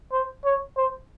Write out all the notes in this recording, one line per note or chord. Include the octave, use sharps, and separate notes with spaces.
C5
C#5
C5